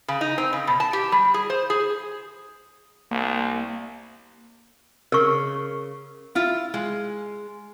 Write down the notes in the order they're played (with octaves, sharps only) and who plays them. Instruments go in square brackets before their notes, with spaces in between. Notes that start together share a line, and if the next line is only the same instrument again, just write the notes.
[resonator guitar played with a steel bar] C#3
D#4
C4
C#3
B2
A5
G4
G3
G#4
C5
G#4
[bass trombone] C2 [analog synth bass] A#3
[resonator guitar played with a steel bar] C#3 [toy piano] A#4 C#6
[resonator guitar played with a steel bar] E4 F4
G#3